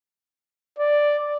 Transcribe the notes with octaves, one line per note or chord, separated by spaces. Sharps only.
D5